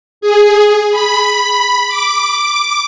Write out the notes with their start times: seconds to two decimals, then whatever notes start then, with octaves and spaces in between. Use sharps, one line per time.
0.21 G#4
0.91 B5
1.88 D6